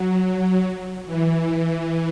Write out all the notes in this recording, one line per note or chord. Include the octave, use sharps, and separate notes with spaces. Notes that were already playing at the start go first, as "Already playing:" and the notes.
Already playing: F#3
F#3
E3